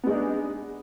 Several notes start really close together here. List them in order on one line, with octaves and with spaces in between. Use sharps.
B3 G#3 D#4 D4